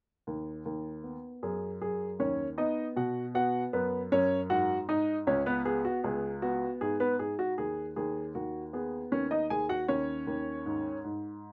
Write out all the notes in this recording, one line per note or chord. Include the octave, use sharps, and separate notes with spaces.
D#2
D#2
B3
F#2 G#4
F#2 G#4
D#2 C#4 C#5
B3 D#4 D#5
B2 F#4 F#5
B3 F#4 F#5
F#2 B3 B4
F#2 C#4 C#5
G#2 F#4 F#5
G#2 D#4 D#5
C#2 C#4 C#5
B3 B4
B3 G#4
F#4
C#2 G#4
B3 F#4
G#2 G#4
B3 B4
G#2 G#4
F#4
D#2 G#4
D#2 G#4
D#2 F#4
B3 G#4
D#2 C#4 C#5
D#4 D#5
D#2 G#4 G#5
F#4 F#5
D#2 C#4 C#5
D#2
G#2
G#2